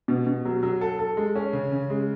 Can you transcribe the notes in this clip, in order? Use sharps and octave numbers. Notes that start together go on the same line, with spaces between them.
B2
B2
F#3
F#3
A4
A4
G#3
C#4
C#3
C#3
G#3